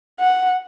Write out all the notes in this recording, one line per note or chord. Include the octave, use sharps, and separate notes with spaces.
F#5